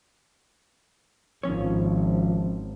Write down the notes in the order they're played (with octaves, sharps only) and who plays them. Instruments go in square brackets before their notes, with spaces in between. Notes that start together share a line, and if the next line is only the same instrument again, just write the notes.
[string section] G#1 [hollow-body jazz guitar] D#3 C#4 C#5 [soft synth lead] F3